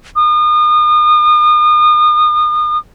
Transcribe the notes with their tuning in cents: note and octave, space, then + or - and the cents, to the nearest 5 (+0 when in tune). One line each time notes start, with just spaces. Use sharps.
D#6 -35